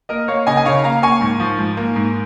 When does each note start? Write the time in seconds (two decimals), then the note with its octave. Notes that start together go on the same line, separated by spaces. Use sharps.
0.09 A#3 A#4 D#5
0.28 A#3 C#5 F5
0.47 C#3 D#5 G#5
0.57 G#5
0.65 C#3 C#5 F5
0.84 A#3 F5 A#5
1.02 A#3 G#5 C#6
1.21 G#2
1.40 F3
1.58 G#2
1.77 A#3
1.96 G#2